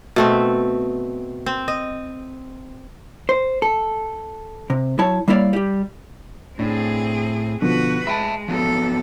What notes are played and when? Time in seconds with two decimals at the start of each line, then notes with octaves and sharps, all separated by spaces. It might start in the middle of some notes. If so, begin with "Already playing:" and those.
0.16 B2 A3 C4
1.46 C4
1.68 D#5
3.29 C5
3.62 A4
4.70 C3
4.99 F#3 E4 C#5 A5
5.28 G3 A#3 E4 C#5 D5 F5
5.53 G3 G4
6.59 A2 C4 D4 G#4
7.62 B2 D3 F3 F#4 B4
8.07 G#3 E5 G5 A5 B5
8.48 F3 F#3 B3 A4